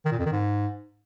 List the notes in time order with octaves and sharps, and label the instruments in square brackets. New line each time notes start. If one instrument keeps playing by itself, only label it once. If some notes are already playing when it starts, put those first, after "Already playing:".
[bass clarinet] D#3
A#2
F2
D#3
G#2